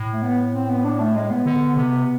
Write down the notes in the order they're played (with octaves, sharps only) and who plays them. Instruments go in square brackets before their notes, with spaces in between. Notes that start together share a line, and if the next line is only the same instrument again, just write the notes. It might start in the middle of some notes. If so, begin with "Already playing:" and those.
Already playing: [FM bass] A2
[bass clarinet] A3
B3
C4
B3
D4
A3
G#3
B3
[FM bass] D3
C3